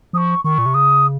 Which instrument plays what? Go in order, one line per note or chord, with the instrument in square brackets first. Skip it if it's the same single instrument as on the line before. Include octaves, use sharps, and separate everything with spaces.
[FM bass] F3 [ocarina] D#6
[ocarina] C#6
[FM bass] D#3 [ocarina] C#6
[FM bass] A#2
C3
[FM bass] C#3 [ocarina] D#6